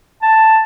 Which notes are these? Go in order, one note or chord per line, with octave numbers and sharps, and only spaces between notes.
A5